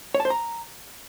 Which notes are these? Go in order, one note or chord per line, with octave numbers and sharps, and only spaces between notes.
C#5
A5
C5
A#5